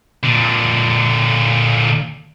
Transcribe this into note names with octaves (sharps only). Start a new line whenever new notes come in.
A#2 D3